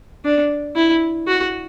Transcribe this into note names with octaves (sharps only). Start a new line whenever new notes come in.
D4
E4
F#4